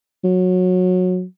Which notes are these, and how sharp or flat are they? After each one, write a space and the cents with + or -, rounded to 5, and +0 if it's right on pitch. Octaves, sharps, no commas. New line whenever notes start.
F#3 -20